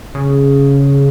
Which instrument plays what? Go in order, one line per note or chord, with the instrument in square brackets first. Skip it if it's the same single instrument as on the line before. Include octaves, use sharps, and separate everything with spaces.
[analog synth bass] C#3